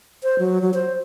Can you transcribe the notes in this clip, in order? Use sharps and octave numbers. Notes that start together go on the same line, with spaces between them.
C5
F#3
F#3
C5